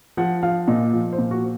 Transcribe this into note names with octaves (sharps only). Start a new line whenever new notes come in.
F3 F#5
F3 F5
A#2 D#5
F3
C5
A#2
F#4